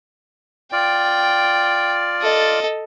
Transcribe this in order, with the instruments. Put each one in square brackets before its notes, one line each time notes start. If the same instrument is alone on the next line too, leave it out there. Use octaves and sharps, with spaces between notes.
[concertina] F4 D5 [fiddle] G5
[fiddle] A4 D#5